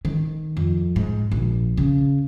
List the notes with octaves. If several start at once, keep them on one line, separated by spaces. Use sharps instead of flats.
D#3
F2
G#2
A#1
C#3